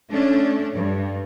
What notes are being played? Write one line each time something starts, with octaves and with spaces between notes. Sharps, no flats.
A3 C#4 D4
G2